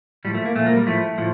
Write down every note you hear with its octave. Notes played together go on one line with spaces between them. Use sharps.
A2 F3 G3
A3
A#3
A#2 F3 A3
A#3
G3
A2 F3 A3
A2 F3